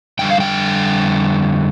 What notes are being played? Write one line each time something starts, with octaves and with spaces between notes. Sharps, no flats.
F2 D3 G3 G5
F5
G5